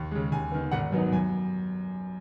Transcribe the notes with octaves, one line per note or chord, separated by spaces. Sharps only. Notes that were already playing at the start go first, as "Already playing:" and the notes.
Already playing: D#2 C#6
C#3 G#3
D#2 G#5
D#3 B3
G#1 F#5
F#2 F#3 B3 D#4
F#2 G#5